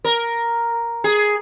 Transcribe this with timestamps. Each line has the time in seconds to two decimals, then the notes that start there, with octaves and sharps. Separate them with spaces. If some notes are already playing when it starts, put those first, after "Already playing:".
0.05 A#4
1.04 G#4